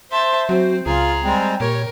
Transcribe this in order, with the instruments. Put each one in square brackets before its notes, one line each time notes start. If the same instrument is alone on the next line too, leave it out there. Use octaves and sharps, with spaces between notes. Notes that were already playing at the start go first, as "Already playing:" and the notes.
[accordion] C5 [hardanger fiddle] E5 A5 [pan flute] C6
[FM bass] F#3 [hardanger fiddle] C4 [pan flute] F#4
[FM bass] C#2 [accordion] F4 [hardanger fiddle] G#4 [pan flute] A#5
[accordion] G3 G#3 C4
[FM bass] A#2 [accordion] G3 C#5 [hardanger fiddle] A#4